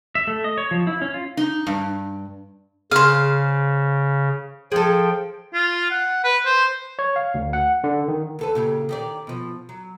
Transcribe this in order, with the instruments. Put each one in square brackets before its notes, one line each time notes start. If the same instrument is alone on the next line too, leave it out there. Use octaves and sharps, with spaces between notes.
[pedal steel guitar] E5
A3
D#5
C#5
F3
E4
C#4
F4
[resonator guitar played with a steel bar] D#4
G2
[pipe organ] C#3 [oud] G#4 [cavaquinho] C5 F5
[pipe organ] F3 G5 [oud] G#4 A4
[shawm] F4
F#5
B4
C5
[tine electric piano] C#5
F5
D2
F#5
D3
D#3
[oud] D2 A4 B4
A#2 C#3 G4
D#3 G4 D5
B2 F3
F#3